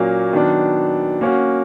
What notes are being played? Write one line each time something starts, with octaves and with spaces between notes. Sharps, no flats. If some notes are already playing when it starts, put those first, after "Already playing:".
Already playing: A#2 F#3 A#3 C#4
D#3 F#3 B3 D4
A#3 C#4 F#4